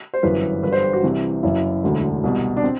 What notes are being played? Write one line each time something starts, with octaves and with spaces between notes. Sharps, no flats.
C5
G1 F#2 E3 B4
G1 G2 D3 B4
C5
G4
F#4
C2 C3 E3
F#1 F#2 E3 E4
E1 D2 D3
C2 B2
D4
C4